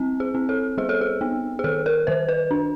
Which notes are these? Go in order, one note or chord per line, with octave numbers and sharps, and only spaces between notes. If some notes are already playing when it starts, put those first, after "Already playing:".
Already playing: G3 C4
G#4
C4
A4
G3 G#4
A4
G#4
B3
G#4
D#3 A4
A#4
D#3 C5
B4
D4